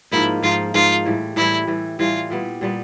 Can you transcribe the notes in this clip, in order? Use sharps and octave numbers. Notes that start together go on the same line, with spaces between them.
G#2 F3 A#3 D#4 E4
G#2 F3 A#3 D#4 F4
G#2 F3 A#3 D#4 F4
A2 E3 G3
A2 E3 G3 E4
A2 E3 G3
A2 E3 G3 F4
A#2 G3 B3
A#2 G3 B3